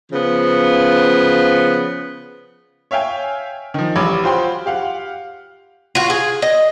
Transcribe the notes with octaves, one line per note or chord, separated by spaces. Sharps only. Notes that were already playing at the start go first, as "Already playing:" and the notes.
C#3 F3 B3
C#5 E5 F5 G5 G#5
D#3 F3
A1 G3 C#5 B5 D6 G#6
F4 F#4 C5 G5 B5 C6
G4 F5 F#5
F4 F#4
G#4
D#5